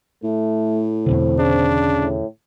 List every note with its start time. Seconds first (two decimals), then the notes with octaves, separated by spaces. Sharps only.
0.24 A2 A3
1.06 E2 B2 D3 C4
1.39 C#3 D4
1.96 A2